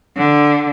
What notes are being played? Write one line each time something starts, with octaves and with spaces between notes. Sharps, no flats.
D3